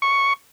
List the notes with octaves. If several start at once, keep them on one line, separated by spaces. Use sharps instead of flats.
C#6